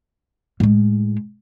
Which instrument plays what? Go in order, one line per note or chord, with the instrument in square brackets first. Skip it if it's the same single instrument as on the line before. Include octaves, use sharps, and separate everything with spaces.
[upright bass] A2 G#3